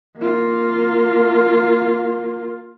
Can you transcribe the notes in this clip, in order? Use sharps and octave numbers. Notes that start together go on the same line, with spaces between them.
A#3 F4